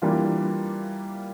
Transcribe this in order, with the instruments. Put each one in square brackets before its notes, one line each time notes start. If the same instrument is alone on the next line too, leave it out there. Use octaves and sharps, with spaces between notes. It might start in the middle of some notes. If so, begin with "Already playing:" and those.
[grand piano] E3 G3 A#3 D4 F4